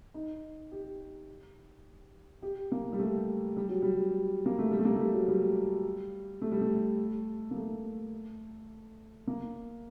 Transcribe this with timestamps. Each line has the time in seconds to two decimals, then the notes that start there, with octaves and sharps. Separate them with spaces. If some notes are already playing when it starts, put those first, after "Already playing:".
0.14 D#4
0.71 G4
2.42 G4
2.72 A#3
2.93 G3
2.99 A3
3.57 G3
3.69 F#3
3.82 G3
4.46 A#3
4.58 A3
4.71 G3
4.79 A3
4.85 A#3
4.95 A3
5.00 G3
5.13 F#3
5.28 G3
6.41 A3
6.52 G3
6.61 A3
7.51 A#3
7.56 A3
9.27 A#3